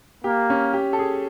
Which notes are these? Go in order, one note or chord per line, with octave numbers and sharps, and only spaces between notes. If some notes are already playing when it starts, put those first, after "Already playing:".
A#3 G4
C#4
G4
A4
G#4